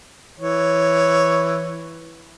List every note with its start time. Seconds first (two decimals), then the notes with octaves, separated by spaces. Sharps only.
0.40 E3 C#5